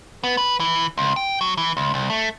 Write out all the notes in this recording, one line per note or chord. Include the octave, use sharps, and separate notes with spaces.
B3
B4
E3
C#2
G5
F#3
E3
C#2
C2
A3